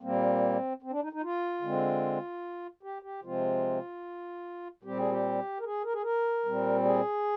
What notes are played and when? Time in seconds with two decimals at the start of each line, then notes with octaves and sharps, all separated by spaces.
0.01 A#2 G3 A#3 C4
0.82 C4
0.91 D4
1.02 D#4
1.13 D#4
1.23 F4
1.62 D3 G#3 C4
2.83 G4
3.02 G4
3.23 C3 F3 G#3 C4 F4
4.83 A#2 G3 C4 G4
4.97 G#4
5.11 G4
5.60 A#4
5.64 G#4
5.84 A#4
5.93 G#4
6.03 A#4
6.45 A#2 G3 C4
6.84 G#4